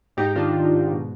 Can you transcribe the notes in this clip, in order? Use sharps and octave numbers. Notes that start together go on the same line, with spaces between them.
G#2 D#4 G4
D#3 D4 F4
D#3
G#2
B2